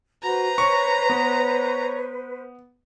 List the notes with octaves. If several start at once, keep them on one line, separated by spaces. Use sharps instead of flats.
F#4 B4 C5 A#5
C#5 C#6
B3